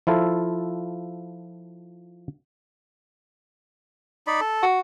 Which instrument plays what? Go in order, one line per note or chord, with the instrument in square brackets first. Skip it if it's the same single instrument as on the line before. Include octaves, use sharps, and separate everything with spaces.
[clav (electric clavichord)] F3 E4 F4 A4
[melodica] D#4 D5 B5
A4
[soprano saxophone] F#4